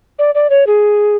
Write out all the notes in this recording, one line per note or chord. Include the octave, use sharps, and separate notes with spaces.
D5
D5
C#5
G#4